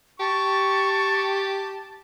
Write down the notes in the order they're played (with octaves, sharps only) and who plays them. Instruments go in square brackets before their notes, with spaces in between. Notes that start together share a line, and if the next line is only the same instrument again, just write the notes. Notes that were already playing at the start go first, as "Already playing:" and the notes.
[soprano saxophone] G4 [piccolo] A5 [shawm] C#6